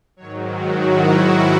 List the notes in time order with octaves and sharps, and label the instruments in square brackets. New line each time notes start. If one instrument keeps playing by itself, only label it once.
[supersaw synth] G#2 D#3 F#3 C#5
F#4
E4